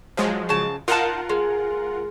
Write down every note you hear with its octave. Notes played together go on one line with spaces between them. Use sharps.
F3 F#3 G#3
C#3 A5
D#4 F4 A#4 F#5 A5
G#3